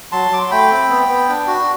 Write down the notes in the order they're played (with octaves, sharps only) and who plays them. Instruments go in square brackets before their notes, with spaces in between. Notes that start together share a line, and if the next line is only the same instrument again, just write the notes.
[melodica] F#3 A5 C6
F#3 D6
C6
A3 G5 B5
C4
B3
B3
D4
F#4